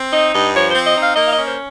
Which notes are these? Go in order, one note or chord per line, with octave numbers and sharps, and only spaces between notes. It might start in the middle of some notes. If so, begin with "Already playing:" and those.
Already playing: C4
D#4 D#5
G2 D#5
F3 C#5
C4 C5
D#5
D#4 F5
A#3 D#5
F5
C#4 D#5
C5